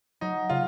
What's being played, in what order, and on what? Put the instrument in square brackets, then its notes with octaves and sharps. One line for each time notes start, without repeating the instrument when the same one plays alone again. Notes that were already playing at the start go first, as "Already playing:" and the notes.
[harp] F#3 [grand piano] D#4
[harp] C#3 [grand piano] F4